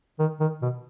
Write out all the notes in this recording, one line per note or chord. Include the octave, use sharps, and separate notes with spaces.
D#3
D#3
B2